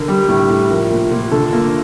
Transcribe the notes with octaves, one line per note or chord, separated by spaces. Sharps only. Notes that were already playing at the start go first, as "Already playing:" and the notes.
Already playing: D3 A#4
G3
A2
A2
F3 A#4
A#2
A#2
D3 A4
A#3